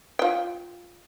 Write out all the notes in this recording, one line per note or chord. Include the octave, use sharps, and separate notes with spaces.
F4 G5